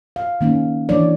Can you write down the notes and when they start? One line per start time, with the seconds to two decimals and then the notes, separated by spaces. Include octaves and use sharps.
0.16 F5
0.41 D#3 A#3 C#4 D#4
0.89 E3 F#3 D4 C#5 D5